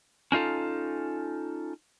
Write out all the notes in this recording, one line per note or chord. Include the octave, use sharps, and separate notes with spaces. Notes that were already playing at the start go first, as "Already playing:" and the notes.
C#4 D#4 F4 A4